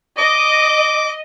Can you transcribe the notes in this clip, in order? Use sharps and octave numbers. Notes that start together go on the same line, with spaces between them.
D#5 D6